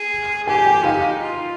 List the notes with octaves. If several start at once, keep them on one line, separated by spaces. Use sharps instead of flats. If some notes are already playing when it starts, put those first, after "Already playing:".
Already playing: G#4
G4 G#5
G5
D#4 F5
F4